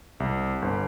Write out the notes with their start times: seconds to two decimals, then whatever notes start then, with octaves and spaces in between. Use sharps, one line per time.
0.20 C2
0.62 G1